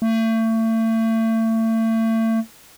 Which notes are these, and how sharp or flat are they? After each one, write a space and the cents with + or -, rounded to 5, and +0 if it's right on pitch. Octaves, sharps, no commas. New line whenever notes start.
A3 +35